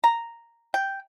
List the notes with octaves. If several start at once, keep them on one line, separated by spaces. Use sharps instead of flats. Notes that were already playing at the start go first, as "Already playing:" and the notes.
A#5
G5